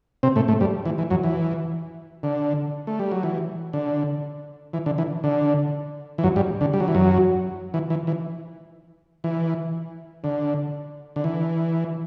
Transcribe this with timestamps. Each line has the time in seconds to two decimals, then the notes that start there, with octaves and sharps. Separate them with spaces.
0.23 C3 C4
0.36 A2 A3
0.48 A2 A3
0.60 G2 G3
0.85 E3
0.98 E3
1.10 F#2 F#3
1.24 E3
2.23 D3
2.87 A3
2.99 G3
3.12 F#3
3.23 E3
3.73 D3
4.73 E3
4.86 D3
4.98 E3
5.24 D3
6.18 E3
6.23 F#2 F#3
6.36 G2 G3
6.61 D3
6.74 G3
6.80 F#3
6.88 E3
6.95 F#2 F#3
7.74 E3
7.90 E3
8.07 E3
9.24 E3
10.24 D3
11.16 D3
11.24 E3